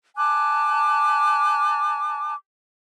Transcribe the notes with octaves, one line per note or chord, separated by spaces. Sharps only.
G#5 A5 D6 F#6